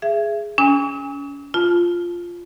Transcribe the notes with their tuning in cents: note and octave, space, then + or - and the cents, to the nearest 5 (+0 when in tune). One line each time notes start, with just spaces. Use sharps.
G#4 +0 E5 +30
C#4 +35 G#5 -35 E6 -45
F4 -5 A5 -30